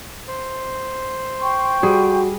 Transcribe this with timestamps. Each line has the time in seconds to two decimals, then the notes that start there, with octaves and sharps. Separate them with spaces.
0.28 C5
1.41 G5 C6 C#6
1.83 G3 F#4 G#4